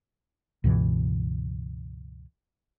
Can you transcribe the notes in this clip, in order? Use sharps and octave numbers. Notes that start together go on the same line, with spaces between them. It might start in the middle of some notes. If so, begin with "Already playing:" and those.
C#2 G2 B2 E3